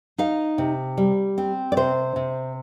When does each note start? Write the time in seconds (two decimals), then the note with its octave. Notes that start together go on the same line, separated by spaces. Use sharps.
0.18 D#4 F5
0.58 C3
0.97 G3
1.38 C4
1.72 D5
1.77 C3 C5
2.16 C3